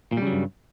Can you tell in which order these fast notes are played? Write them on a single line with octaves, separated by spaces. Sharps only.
A#2 G3 C#3 F#3 G2